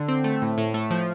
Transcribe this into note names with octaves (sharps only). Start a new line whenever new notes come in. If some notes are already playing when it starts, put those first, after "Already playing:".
Already playing: D3
C4
A3
A2
A2
A3
F3